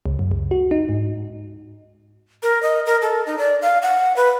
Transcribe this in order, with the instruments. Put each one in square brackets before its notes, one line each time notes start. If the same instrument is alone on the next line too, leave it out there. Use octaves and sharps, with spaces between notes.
[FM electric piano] C#2
F#2
C#2
F#4
D#4
G#2
[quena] A#4
D#5
A#4
A4
D#4
D5
F5
F#5
B4